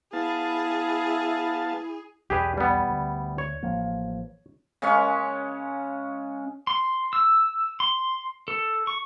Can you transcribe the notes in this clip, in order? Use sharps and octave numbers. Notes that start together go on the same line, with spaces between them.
B3 E4 G#4 F5 A5
B1 E2 G4 G#4 B4
G3 B3
D2
C#5
A1 F3 A#3
C#3 G#3 C#4 C#6
C6
E6
C6
A4
C#6